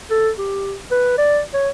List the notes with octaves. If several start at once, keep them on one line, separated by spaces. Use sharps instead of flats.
A4
G4
B4
D5
C#5